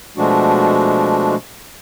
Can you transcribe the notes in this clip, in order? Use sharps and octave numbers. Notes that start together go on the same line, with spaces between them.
B2 F3 G#3 A3 D4 F#4